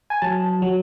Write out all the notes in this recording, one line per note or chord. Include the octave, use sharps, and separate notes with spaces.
G#5
F#3 A5
F#3